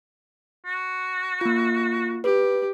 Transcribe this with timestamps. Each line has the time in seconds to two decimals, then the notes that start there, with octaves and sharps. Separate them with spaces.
0.65 F#4
1.41 A#3 F4
2.24 G4 B4